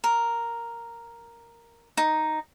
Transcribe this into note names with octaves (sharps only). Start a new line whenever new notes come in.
A#4
D#4